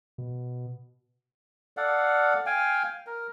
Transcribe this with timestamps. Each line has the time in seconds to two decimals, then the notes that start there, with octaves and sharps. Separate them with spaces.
0.18 B2
1.77 A4 D5 F5 F#5
2.46 F5 G5 G#5
3.07 A#4